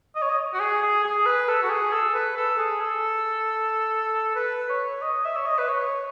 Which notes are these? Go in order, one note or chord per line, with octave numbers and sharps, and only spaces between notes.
D#5
C#5
D#5
F#4
G#4
G#4
G#4
B4
A4
F#4
G#4
A4
B4
A4
G#4
A4
B4
C#5
D#5
E5
C#5
D#5
B4
C#5